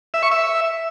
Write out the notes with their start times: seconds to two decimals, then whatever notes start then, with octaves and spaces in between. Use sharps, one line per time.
0.14 E5
0.23 C#6
0.31 E5